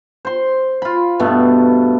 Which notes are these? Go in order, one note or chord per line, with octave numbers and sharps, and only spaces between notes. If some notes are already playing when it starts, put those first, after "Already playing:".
C5 C6
F4 B5
G2 B2 A3 B3